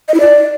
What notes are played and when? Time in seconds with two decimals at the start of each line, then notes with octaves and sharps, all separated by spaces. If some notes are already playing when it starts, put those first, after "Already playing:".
0.08 D#5
0.14 E4
0.20 D5